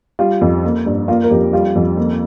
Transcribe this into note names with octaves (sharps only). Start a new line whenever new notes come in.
G3 F4
F2
A#3
G2
A#3 F4
A#4
F2 G4
G3 F4
F2
A#3